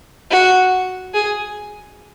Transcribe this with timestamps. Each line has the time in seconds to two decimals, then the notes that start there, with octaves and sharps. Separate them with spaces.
0.31 F#4
1.14 G#4